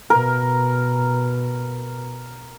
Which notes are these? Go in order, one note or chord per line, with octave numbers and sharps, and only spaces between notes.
B2 A#4